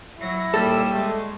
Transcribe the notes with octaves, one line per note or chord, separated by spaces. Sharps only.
F#3 E4 A#6
D#2 A#2 G3 A4 E6
G#3 A3